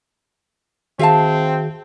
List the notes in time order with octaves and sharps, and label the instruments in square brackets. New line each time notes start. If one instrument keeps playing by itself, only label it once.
[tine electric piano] D#3 F#4 G#4 [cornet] C4 [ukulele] E5 F5 A5